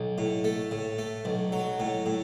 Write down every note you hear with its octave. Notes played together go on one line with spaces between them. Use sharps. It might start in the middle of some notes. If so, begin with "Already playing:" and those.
Already playing: B1
A2
A3
A2
A3
B1
F#3
A2
A2